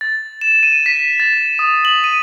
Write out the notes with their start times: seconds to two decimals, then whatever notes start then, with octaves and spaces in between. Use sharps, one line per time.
0.01 A6
0.41 E7
0.63 D#7
0.86 B6
1.20 A6
1.59 D#6
1.85 F#7
2.04 D#7